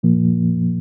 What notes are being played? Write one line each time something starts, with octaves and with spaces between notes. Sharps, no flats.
A#2 F3 A#3